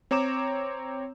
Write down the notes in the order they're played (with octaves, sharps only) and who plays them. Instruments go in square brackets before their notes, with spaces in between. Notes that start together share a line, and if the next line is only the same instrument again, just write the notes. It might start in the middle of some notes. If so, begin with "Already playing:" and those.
[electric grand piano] C4 C#5 A#5 D6 E7